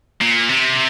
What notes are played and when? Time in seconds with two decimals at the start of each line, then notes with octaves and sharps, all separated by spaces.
0.21 A#2
0.49 C3